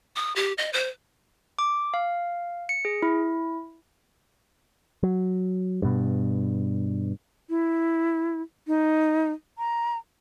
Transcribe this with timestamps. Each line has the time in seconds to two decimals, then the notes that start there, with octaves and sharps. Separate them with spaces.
0.16 D#6
0.36 G4
0.58 D#5
0.73 C5
1.59 D6
1.94 F5
2.69 C#7
2.85 G#4
3.02 E4
5.03 F#3
5.82 G2 B2
7.49 E4
8.67 D#4
9.58 A#5